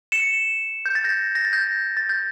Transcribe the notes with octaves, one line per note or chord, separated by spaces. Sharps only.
C#7 E7
G6
A6
G6 A#6
A#6
A6
G6 A#6
A6
G6